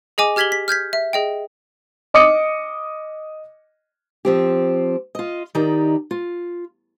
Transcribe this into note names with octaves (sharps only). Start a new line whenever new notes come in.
G#4 D#5 G#5 D6
G4 F6 G#6 B6 F#7 G7
B6
F6 G6 G#6 B6
E5
G#4 D#5 G5
D#5 D6 D#6 C#7
F3 C4 G4
F4 D#5
D#3 D#4 G4 D5 A#5
F4